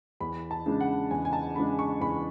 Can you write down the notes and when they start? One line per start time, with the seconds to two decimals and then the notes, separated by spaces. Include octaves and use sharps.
0.21 E2 B5
0.51 A5
0.66 C#3 G#3 D4
0.81 F#5
1.11 E2 G#5
1.25 G#5
1.33 A5
1.56 C#3 G#3 D4 B5
1.79 C#6
2.01 E2 B5